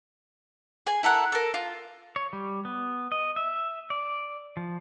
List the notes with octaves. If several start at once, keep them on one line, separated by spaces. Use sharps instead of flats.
G#4 G#5
E4 A4 A#4 F#5
A4 A#4
F4
C#5
G3
B3
D#5
E5
D5
F3